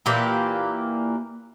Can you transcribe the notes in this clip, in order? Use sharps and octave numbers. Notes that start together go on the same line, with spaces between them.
A#2 E3 A#3 G4